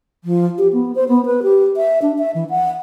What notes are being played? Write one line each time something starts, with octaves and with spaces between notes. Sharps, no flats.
F3
G4
B3
C5
B3
B4
G4
E5
D4
E5
E3
F#5